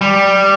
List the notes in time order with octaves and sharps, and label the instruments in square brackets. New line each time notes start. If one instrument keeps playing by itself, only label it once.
[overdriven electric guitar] G3